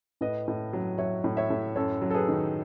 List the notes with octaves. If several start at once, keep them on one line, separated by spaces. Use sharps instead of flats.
A2 B4 D#5
A2
F#3
F#3 C#5 E5
A2
C#5 E5
A2
F#2 A4 C#5
F#3
A4
G#4 B4
D#3